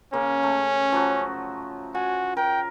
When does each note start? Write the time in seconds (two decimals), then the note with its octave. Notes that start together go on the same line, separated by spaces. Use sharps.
0.13 C#3 A#3 C#4
0.43 A3
0.92 F3 F#3 F#4
1.95 F#4 G#5
2.37 A#4 G5